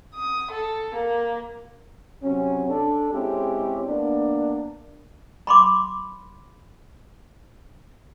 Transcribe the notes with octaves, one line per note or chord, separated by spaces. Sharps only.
D#6
A4
A#3
C3 F#3 C#4
D4 A4
G#3 C4 C#4 E4 G4
A#3 B3 D4
B5 C6 D6